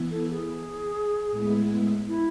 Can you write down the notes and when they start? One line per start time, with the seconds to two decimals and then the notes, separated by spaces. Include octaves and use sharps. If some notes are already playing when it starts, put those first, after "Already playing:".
Already playing: E3 B3 E4
0.11 A4
0.31 G#4
1.30 A2 G#3 B3 E4
2.08 E4